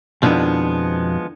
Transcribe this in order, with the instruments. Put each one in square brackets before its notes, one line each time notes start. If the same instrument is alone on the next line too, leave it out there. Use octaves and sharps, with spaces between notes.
[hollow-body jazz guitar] F2 B2 [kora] D3 D#3 E4 [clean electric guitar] F3 G#3 B3